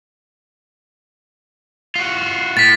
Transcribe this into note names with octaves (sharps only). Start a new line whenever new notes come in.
F4 F#4
A2 A6 B6